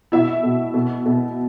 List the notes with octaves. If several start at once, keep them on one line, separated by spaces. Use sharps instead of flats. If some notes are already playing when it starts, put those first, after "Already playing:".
B2 E4 E5
B2
B2
B2